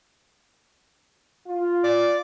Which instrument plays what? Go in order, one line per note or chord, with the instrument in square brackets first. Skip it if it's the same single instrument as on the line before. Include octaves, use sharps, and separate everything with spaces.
[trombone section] F4
[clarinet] D5